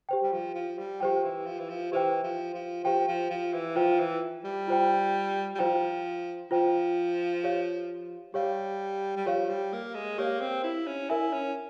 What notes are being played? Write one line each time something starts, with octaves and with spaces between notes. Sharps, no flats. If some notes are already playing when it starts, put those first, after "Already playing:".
G4 C5 G5
G3
F3
F3
G3
F3 G4 C5 G5
E3
F3
E3
F3
E3 G4 C5 G5
F3
F3
F3 G4 C5 G5
F3
F3
E3
F3 F4 C5 G5
E3
G3
F4 C5 G5
G3
F3 F4 C5 G5
F3 F4 C5 G5
G4 C#5 F5
G3 G4 C#5 F5
G3
F3 G4 C#5 F5
G3
A#3
G#3
A#3 G4 C#5 F5
C4
E4
C#4
E4 A#4 E5 G#5
C#4